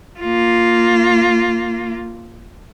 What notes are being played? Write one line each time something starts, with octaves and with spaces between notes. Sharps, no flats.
A#3 F4